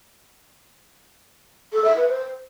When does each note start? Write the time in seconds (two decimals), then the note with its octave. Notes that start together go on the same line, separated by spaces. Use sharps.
1.73 A4
1.85 E5
1.96 B4
2.08 C5